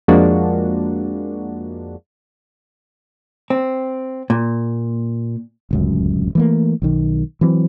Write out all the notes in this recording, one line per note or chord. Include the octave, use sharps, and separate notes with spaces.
F2 F3 G#3 A#3 D4 F#4
C4
A#2
D1 C#2 F#2
E3 A3 A#3
B1 D#3
E3 F#3 C4